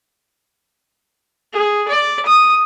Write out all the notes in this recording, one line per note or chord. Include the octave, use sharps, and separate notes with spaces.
G#4
D5
D#6